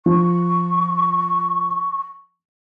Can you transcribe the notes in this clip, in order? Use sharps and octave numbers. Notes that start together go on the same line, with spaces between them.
F3 C#6